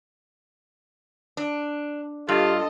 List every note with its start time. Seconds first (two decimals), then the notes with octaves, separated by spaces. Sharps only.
1.37 D4
2.29 G2 F4 G4 A4 D#5